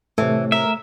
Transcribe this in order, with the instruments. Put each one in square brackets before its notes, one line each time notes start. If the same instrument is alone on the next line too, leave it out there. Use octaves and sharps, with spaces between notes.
[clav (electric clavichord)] A2 C3 [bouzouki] E3 [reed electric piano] A3
[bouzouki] A#4 [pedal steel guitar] E5